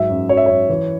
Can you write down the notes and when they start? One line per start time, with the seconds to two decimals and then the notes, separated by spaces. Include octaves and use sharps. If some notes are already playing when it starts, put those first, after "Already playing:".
Already playing: G#2 F#3 E5
0.10 F#2
0.29 F#3 C#5
0.37 E5
0.46 F#2 C#5
0.69 E3